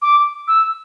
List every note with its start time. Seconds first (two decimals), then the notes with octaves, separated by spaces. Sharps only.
0.02 D6
0.48 E6